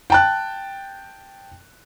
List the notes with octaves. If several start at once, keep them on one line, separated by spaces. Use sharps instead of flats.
G5 A5 F#6